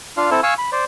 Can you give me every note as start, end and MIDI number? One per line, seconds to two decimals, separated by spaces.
0.17 0.30 62
0.17 0.30 65
0.17 0.30 77
0.31 0.41 60
0.31 0.41 64
0.31 0.41 69
0.43 0.54 77
0.43 0.54 80
0.43 0.54 85
0.43 0.54 88
0.58 0.70 83
0.72 0.85 72
0.72 0.85 74